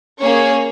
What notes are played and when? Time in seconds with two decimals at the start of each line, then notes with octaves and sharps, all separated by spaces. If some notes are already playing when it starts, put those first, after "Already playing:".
0.21 A#3 C#4 G#4 C#5